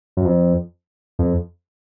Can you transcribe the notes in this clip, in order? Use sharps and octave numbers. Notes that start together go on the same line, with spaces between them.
F#2
F2
F2